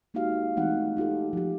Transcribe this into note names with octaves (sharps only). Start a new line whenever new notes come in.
G#3 A#3 D#4 F#4 G4 F5
E3 G#3 A3 C4 D#4 F#5
D#4 F4 G4 A4
F3 G4